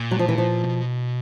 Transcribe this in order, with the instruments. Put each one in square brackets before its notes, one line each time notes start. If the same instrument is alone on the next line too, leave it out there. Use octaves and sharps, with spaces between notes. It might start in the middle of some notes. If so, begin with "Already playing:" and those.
Already playing: [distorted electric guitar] A#2
[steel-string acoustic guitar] F#3
F3
E3
F3
[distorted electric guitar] B2